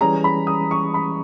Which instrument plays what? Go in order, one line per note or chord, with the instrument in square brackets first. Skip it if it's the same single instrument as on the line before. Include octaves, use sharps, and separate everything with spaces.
[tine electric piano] E3 G3 C#4 G#4 [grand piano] A#5
[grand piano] B5
D#6
C#6
B5